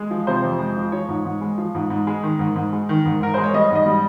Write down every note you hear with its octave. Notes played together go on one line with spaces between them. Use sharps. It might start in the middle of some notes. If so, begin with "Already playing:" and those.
Already playing: G#3
F3
C3 C5
F2
G#3
F3
F3 C#5
G#2
G#2
G#3
F3
G#2
G#2
G#3
D#3
G#2
G#2
G#3
D#3
G#2
G#2 A#4
G#3 C5
C#5
G3 D#5
G#2 D#5
G3